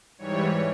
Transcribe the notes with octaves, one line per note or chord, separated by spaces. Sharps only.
G#2 E3 G3 C#5